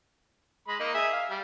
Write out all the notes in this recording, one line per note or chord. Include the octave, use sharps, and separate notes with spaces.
G#3 B5
A#3 D#4 D#5
G#4 E5
F5
G3